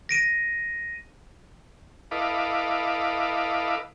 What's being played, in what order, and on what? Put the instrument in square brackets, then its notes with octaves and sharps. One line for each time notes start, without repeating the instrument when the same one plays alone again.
[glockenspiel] A#6 D7 D#7
[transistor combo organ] E4 A4 B4 D#5 F5 D6